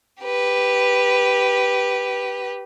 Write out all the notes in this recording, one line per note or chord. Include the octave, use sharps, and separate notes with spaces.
G4 B4